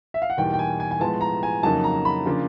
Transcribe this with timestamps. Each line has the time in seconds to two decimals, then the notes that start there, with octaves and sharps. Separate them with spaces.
0.14 E5
0.22 F5
0.30 F#5
0.37 E2 B2 G3 A#3 D#4 G5
0.54 G5
0.59 G#5
0.80 G#5
0.91 G#5
1.00 A2 F3 G#3 B3 A5
1.21 A#5
1.43 G#5
1.63 F2 C#3 F#3 A#3 D#4 A5
1.84 A#5
2.05 B5
2.26 C#3 F3 A#3 D4